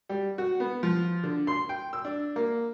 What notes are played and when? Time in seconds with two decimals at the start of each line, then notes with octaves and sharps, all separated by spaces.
0.09 G3
0.38 F#4
0.60 B3
0.83 F3
1.23 D3
1.47 C6
1.69 G5
1.93 E6
2.05 D4
2.36 A#3